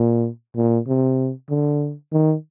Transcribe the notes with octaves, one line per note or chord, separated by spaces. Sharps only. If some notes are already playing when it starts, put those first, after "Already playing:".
Already playing: A#2
A#2
C3
D3
D#3